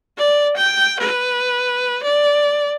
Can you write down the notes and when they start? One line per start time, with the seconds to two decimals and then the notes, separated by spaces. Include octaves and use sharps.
0.17 D5
0.56 G5
0.99 B4
2.03 D5